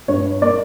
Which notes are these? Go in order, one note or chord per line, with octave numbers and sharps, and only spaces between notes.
G2 C#5
A#3 D5